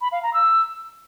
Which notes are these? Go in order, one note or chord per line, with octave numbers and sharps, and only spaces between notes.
B5
F5
A#5
E6